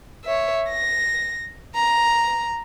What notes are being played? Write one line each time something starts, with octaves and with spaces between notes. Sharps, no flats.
C#5 E5
A#6
A#5